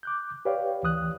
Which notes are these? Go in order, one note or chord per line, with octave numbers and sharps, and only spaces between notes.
D6 F#6 G6
G4 B4 C#5 D5 F5 G5
D2 E3 D#6 F#6